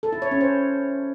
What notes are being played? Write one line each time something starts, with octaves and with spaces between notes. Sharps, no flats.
A4
E4
C#5
C#4
C5